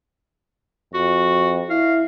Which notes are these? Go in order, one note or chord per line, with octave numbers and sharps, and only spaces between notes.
F2 F#4
E4 F5